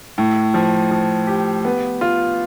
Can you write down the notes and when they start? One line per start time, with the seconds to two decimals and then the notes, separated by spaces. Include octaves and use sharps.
0.18 A2
0.54 F3
0.91 F3
1.27 G4
1.65 B3
2.01 F4